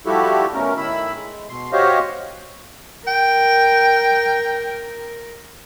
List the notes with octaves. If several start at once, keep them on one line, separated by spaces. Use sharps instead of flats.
F3 G3 E4 F#4 G4 A4
B2 A3 C#4 A#4
A2 D#3 E4 B5 E6
G#3
B2 C6
F#4 G4 C5 C#5 D#5 F5
A#4 G5